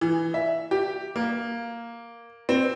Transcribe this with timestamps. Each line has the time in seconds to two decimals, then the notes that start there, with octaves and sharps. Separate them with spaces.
0.01 E3
0.34 E5
0.71 G4
1.16 A#3
2.49 C4